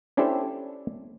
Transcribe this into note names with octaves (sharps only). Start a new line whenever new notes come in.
C#4 D4 E4 G4 A4 C5